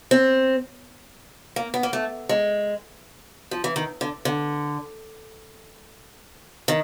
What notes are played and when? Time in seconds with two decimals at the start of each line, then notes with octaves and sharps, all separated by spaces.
0.11 C4
1.56 A#3
1.74 B3
1.83 A#3
1.93 A3
2.29 G#3
3.51 F3
3.64 E3
3.76 D#3
4.01 D3
4.25 D3
6.68 D#3